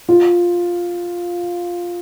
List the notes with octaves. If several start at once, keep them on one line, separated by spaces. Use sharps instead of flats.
F4